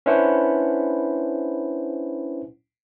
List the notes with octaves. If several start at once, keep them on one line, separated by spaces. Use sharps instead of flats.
C#4 D4 E4 B4 C5 F#5